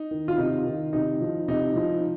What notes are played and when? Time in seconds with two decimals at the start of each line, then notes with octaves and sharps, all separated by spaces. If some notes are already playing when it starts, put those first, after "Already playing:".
Already playing: D#4
0.11 D#3
0.28 F4
0.38 C3 D#4
0.66 D#3
0.93 C3 D#4
1.21 F3
1.48 C3 D#4
1.76 F3